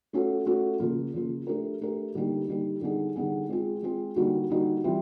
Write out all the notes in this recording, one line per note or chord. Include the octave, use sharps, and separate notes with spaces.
A3 C#4 F#4 A4
A3 C#4 F#4 A4
C#3 F3 A#3
C#3 F3 A#3
A3 D4 G4 A#4
A3 D4 G4 A#4
D3 G3 A#3 D#4 G4
D3 G3 A#3 D#4 G4
D3 G3 B3 D#4 G#4
D3 G3 B3 D#4 G#4
G#3 C4 F4 G#4
G#3 C4 F4 G#4
D3 G3 A#3 D#4 F#4
D3 G3 A#3 D#4 F#4
E3 G3 C4 F4